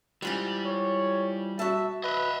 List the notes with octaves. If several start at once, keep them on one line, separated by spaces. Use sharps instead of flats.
G#2 E3 G3 F4
C#5
F#4 E5 A5
B4 D#5 E5